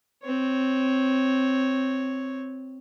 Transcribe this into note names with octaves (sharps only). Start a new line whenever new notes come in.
C4 C#5